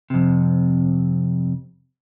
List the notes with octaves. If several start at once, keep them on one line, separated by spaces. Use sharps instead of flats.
F2 C3